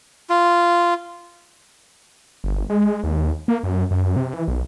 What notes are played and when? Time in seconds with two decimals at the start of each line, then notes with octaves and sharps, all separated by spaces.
0.30 F4
2.44 G1
2.70 G#3
3.04 D#2
3.48 A#3
3.63 F#2
3.91 F#2
4.16 C3
4.34 E3
4.48 B1